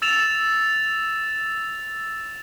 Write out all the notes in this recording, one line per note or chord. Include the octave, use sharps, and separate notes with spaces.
E6 A6 E7 F7